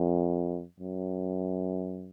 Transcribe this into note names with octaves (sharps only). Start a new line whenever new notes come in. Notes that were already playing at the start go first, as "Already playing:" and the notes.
Already playing: F2
F#2